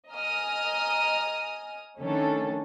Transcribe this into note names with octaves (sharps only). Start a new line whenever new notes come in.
D#5 G#5 A#5 D#6 F6
D#3 A3 C#4 D4 A4